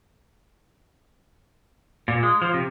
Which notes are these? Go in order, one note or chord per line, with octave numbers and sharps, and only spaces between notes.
A#2
G#3
F3
C3